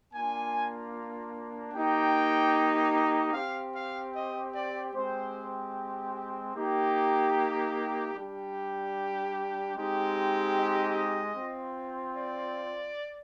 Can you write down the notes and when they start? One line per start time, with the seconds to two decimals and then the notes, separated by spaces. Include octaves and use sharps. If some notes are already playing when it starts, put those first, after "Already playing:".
0.13 A#3 D4 F4 G#5
1.73 A#3 D#4 G4 G5
3.33 C4 G4 F5
3.74 F5
4.14 D#5
4.54 D5
4.94 G#3 C4 G4 C5
6.55 A#3 D#4 G4
8.15 G3 D4 G4
9.75 G#3 C4 D#4 G4
10.56 D#5
11.36 C4 F4
12.16 D5